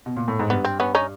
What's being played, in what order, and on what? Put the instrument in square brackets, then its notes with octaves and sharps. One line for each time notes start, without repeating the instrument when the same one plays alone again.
[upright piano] B2
A#2
A2
G#2
[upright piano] G2 [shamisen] B3
[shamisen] C4
B3 C#4
C#4 D#4